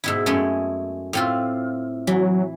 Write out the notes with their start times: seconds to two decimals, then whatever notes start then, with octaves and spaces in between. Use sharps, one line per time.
0.04 G#2 B2 E4
0.26 F#2 G#3 A3
1.13 A2 C4 F4
2.07 E3 F#3